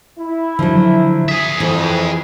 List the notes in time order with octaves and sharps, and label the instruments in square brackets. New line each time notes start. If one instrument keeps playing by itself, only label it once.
[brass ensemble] E4
[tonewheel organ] D3 [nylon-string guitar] F3 F#3
[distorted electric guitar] G#4 E5 [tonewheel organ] D#6
[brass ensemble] F2 [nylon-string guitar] E3